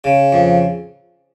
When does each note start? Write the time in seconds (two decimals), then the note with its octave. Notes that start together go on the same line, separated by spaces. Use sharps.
0.04 C#3
0.32 F2